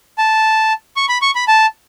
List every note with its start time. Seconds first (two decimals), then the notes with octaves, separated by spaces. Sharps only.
0.18 A5
0.96 C#6
1.09 B5
1.22 C#6
1.35 B5
1.48 A5